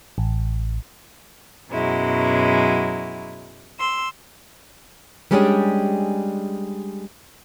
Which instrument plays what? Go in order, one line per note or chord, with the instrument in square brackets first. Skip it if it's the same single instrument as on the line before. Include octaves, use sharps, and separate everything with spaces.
[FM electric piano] A1
[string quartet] F#2 B2 F#3 G#3 E4
C6 E6
[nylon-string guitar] G3 G#3 C#4 D4 G4 G#4